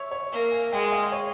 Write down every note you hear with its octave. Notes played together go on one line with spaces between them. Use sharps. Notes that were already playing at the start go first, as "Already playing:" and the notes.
Already playing: C#5 E5
C#5
A#3
G#5
G#3 G5
F5
C#5